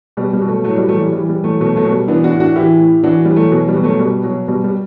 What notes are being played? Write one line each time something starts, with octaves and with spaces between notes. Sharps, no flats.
B2 G3
G3
B2
F#3 A3
A2 F#3 A3
G3
E3 F#3 A3
G3
E3 G3
G3
E3
F#3 A3
B2 F#3 A3
F#3 A3
B2
G3
E3 B3 D4
D4 F#4
A2
D4 F#4
E3 E4 G4
A2
E3 D4 F#4
E3 G3
F#3 A3
B2 F#3
G3
B2
F#3 A3
B2 G3
B2 F#3
B2 G3
G3